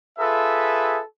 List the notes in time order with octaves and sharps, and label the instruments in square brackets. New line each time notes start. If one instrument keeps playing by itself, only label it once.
[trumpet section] F4 G#4 A4 B4 E5